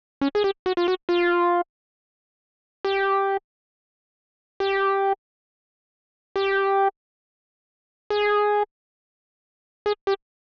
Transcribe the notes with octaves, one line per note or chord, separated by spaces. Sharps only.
C#4
G#4
G4
F#4
F4
F#4
F4
G4
G4
G4
G#4
G#4
G4